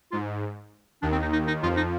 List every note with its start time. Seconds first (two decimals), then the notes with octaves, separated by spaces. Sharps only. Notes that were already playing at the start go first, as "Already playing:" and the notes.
0.12 G#2 F4
1.02 D#2 D#3 D4
1.12 C4
1.22 D#4
1.33 D#4
1.47 D#4
1.63 F2 F3 F4
1.77 D#4